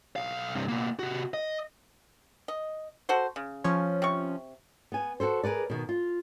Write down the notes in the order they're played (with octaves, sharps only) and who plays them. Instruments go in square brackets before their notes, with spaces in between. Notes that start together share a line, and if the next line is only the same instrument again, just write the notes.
[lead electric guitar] B1 F5
G2 C3
B2 A#3
C3 F#4
D#5
[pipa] D#5
F#4 A4 C5
C#3
[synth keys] F3 C#4
[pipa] C3 C#6
[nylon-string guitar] B3 G#5
F#4 G#4 A4 C5
G#4 A#4 B4 D5
B2 D#3
F4